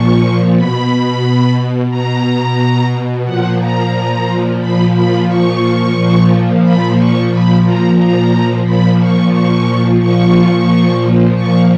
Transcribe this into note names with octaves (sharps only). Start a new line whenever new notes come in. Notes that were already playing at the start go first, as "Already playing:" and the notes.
Already playing: A#2 F3 C#6
B2 B5
B2 A#5
A#2 F3 F#5
A#5
A#2 F3 B5
B5
C#6
A#2 F3
B5
C#6
A#2 F3 B5
A#5
A#5
A#2 F3 B5
C#6
C#6
A#2 F3 C#6
A#2 F3 C#6